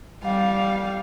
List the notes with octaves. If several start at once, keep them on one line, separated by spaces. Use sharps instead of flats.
G3 F5